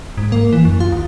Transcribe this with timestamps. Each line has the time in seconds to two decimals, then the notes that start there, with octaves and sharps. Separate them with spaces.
0.17 G#2
0.32 A#3
0.53 E3
0.65 F#2
0.80 F4
0.92 D#2